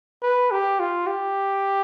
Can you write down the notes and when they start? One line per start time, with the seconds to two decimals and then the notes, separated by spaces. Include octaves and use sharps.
0.22 B4
0.51 G4
0.79 F4
1.07 G4